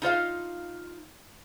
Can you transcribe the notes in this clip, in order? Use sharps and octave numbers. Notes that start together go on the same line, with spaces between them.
D#4 F4 C5 F5